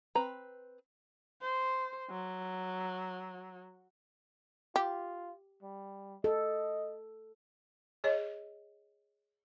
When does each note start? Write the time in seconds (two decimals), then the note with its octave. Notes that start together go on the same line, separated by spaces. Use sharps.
0.15 C4 B4 A#5
1.42 C5
2.11 F#3
4.76 F4 G4
5.63 G3
6.24 A4 D#5
8.04 G#4 C#5 D#5